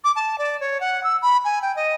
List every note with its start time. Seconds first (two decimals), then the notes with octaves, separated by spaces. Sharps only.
0.04 D6
0.15 A5
0.38 D5
0.60 C#5
0.80 F#5
1.03 E6
1.22 B5
1.44 G#5
1.62 G5
1.76 D#5